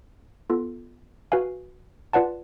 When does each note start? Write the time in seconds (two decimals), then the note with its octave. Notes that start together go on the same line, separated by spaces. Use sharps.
0.50 B3 F4 A4
1.32 F#4 B4 F5 G#5
2.13 F4 B4 D5 F#5 A5